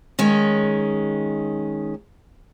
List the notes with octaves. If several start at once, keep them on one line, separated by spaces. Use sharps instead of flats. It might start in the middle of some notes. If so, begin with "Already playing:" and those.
D#3 G#3 C#4